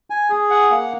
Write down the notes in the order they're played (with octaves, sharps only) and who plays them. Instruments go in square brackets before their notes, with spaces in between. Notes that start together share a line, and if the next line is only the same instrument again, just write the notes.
[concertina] G#5
G#4
F#5
A#3